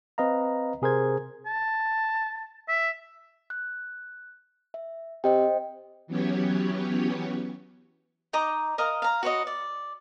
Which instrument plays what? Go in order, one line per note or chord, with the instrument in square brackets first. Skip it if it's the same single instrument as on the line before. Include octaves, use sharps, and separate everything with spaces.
[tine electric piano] C4 B4 D#5 F5 A#5
C3 G#4 A#4 C5 G#6
[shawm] A5
E5
[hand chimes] F#6
E5
[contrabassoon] C3 [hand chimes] C5 D#5 G5
[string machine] E3 F#3 B3 C#4 G4 C#5
[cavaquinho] D#4 D#5 A#5 D6
A#4 D#5 F5 A#5
F5 A#5
F#4 B4 C#5 D#5
D5